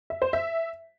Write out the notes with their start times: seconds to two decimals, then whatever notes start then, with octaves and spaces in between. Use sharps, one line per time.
0.10 E5
0.22 C5
0.33 E5